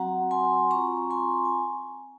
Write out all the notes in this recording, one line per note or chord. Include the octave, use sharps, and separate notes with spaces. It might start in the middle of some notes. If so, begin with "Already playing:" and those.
Already playing: F#3 C4 F#4 F#5 A#5
G#5 C6
C4 F4 A#5 C#6
G#5 C6
G#5